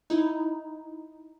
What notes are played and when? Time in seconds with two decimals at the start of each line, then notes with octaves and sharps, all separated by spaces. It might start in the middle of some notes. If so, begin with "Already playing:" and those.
0.10 D#4 E4